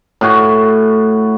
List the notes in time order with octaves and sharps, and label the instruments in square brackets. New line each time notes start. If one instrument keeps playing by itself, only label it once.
[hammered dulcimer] A2 F#4 G#5